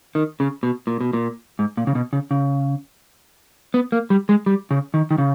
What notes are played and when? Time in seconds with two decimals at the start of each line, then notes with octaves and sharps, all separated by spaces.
0.15 D#3
0.40 C#3
0.63 B2
0.87 A#2
1.01 B2
1.13 A#2
1.59 G#2
1.77 A#2
1.87 C#3
1.95 B2
2.13 C#3
2.31 C#3
3.74 B3
3.92 A#3
4.10 G3
4.29 G#3
4.46 G3
4.71 C#3
4.94 D#3
5.11 D#3
5.18 C#3